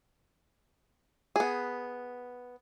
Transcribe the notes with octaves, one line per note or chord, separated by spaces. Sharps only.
B3 G#4